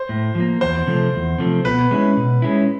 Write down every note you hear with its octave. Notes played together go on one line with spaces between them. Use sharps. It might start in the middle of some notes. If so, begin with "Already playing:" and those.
Already playing: C5
A2
F3 A#3
E2 C5
C3 F3 A3 C4
E2
C3 F3 A3 C4
B2 B4
G#3 C#4 E4
B2
G#3 C#4 E4